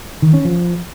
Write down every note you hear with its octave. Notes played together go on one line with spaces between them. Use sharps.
D#3
C#4
F3